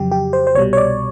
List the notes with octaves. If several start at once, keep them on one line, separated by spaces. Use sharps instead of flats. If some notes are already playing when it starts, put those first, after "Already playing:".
Already playing: F2 C#3 F#3 G4
G4
C5
C5
C2 B2 G3 C#5
C#5
D5